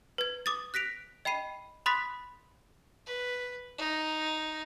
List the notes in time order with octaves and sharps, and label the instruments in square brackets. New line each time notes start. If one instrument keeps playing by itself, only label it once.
[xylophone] B4 G#6
D6 D#6 A6
F#6 A#6 B6 D7 F7
D#5 G5 B5 C7 D#7
B5 C6 D#6 F#6 A6 B6
[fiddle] B4
D#4